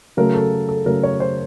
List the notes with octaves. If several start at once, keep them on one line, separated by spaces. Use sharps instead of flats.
C#3 F#3 A3 A#4
A4
A4
C#3 F#3 A3 A#4
C#5
C5